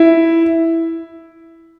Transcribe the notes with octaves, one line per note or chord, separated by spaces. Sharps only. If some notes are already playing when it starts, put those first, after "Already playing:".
Already playing: E4